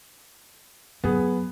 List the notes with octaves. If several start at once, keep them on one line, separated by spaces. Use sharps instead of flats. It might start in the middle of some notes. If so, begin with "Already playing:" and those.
F#2 B3 G#4